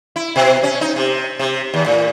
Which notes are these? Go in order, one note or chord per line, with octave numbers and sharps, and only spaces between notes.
E4
B2
C#4
D#4
C3
C3
D#2
A2